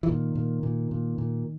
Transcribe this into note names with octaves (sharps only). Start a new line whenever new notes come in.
E3
A#2 D#3
A#2
A#2
A#2
A#2